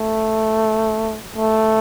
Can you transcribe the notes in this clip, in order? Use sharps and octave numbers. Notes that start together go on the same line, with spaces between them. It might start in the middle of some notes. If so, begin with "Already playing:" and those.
Already playing: A3
A3